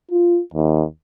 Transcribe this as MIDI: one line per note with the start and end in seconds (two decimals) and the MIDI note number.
0.11 0.40 65
0.54 0.83 39